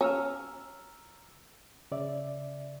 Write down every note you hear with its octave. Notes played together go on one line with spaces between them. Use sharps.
C#4 A#5 E6 F6
C#3 D5 E5